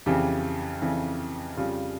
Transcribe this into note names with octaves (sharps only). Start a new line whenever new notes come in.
F2 C#3 E3 G4
F2 C#3 E3
F2 C#3 G3 F4